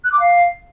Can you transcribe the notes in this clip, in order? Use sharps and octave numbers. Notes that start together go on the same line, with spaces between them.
F#6
D6
F5